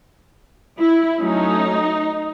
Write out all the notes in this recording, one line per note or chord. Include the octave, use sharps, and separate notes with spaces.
E4
F#3 A3 C#4 D#4